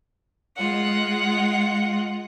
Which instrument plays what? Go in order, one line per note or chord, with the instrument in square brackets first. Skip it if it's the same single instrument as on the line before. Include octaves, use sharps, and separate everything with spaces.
[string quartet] G#3 F4 F#5